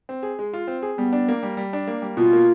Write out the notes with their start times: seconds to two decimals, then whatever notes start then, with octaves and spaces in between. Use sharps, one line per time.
0.09 C4
0.23 G#4
0.39 G#3
0.54 F4
0.67 C4
0.82 G#4
0.97 G3 B3
1.13 D4
1.28 A#3
1.43 G3
1.57 G3
1.73 D4
1.87 A#3
2.02 G3
2.17 B2 F4
2.33 A#3